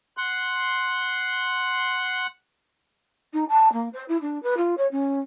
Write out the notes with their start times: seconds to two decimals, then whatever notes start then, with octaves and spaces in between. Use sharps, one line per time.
0.17 F#5 C6
3.32 D#4
3.48 A5
3.72 A#3
3.93 C5
4.08 E4
4.21 D4
4.42 B4
4.57 F4
4.77 C#5
4.91 C#4